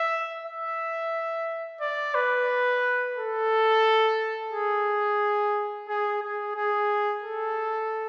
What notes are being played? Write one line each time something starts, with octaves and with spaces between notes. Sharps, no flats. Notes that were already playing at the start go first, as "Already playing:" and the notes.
Already playing: E5
E5
D5
B4
A4
G#4
G#4
G#4
G#4
A4